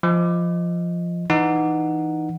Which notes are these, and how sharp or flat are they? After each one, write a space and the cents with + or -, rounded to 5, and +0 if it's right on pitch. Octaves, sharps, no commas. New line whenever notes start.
F3 -10 D#5 +0
E3 +0 D#4 -10 F#5 +0